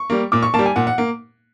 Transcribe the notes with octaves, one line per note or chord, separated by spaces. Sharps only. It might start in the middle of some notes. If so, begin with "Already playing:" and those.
Already playing: C#6
G3 A#3
A#2 D6
C#6
A#3 A5
G3
G#5
A#2 F#5
F#5
A#3